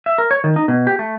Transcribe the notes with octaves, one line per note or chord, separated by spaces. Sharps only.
E5
A#4
C#5
D#3
D#4
B2
G4
A3